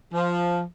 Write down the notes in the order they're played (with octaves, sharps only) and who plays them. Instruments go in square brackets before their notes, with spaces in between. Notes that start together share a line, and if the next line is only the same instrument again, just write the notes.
[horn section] F3